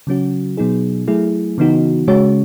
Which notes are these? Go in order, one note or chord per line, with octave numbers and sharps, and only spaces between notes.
C#3 F#3 C#4 F#4
B2 F#3 B3 D#4 G#4
F#3 A3 E4 G#4
C#3 E3 B3 D#4 F#4
C#3 G#3 C#4 F#4 C#5